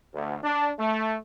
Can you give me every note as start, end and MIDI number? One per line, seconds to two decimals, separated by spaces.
0.14 0.37 38
0.44 0.70 62
0.80 1.16 57